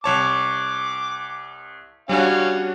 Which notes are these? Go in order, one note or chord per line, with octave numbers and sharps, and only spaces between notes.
C2 C#5 A5 D6
G3 C#4 D4 F#4 F5